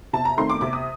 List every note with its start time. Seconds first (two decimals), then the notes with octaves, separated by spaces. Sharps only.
0.13 C3 A5
0.25 A#5
0.37 D#3 A3 C4 C6
0.50 D6
0.61 C3 D6
0.73 D#6